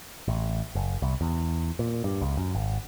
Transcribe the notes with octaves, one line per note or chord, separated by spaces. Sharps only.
A1
F#1
C2
E2
A#2
G2
C#2
F#2
G#1